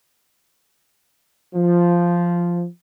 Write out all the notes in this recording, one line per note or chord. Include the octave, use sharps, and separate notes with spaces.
F3